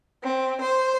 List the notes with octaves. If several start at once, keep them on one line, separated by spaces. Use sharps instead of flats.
C4
C5